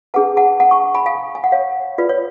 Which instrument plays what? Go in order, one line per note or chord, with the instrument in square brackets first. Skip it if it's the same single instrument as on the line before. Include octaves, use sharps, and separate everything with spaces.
[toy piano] D4 G#4 B4 F#5 A5
F#5 A5
F#5 A5
A5 C#6
G#5 B5
F5 G#5
G#5
F#5
C#5 F5
F4 B4 D5
C#5